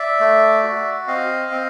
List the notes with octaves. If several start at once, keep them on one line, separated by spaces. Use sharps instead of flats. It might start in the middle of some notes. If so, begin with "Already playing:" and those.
Already playing: D5 E5
A3
F#4
C4 D#5 F5
C4